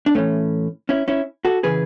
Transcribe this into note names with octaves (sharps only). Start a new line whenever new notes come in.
D4
A2 E3 A3 C#4
C#4 E4
C#4 E4
F#4 A4
C#3 E3 G#4 B4